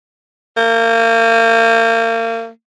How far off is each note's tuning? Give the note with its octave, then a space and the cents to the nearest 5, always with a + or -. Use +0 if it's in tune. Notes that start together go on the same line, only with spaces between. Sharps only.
A#3 -35